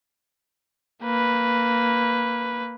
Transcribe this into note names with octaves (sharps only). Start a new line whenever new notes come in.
A#3 B4